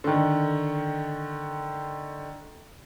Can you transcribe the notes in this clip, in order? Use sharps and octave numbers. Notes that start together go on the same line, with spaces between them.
D3 D#3